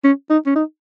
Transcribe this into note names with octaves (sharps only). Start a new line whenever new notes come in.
C#4
D#4
C#4
D#4